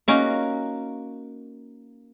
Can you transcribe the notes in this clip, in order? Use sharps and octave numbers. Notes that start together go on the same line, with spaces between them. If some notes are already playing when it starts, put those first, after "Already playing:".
A#3 C#4 D#4 F#4